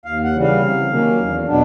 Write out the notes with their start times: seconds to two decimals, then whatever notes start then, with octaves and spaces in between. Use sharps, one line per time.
0.05 D#2 F5
0.24 F#5
0.33 C#3 E3 G3
0.43 F5
0.62 C3
0.90 D#3 F#3 A#3 C#4
1.18 E2
1.47 B2 F#3 B3 D4